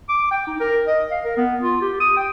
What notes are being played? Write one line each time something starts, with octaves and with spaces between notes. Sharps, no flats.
D6
G5
D#4
A#4
D#5
F5
A#4
B3
F4
G4
D#6
G5